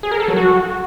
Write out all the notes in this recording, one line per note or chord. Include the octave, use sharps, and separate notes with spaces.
G#4
A#4
A4
F#3
F#4